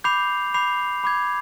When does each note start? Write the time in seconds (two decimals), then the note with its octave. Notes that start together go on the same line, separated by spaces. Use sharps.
0.04 B5 D6 G6 C7 F7
0.54 B5 D6 G6 C7 F7
1.04 B5 D6 G#6